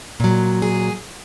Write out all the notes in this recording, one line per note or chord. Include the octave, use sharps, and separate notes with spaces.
A#2 F#3
G#4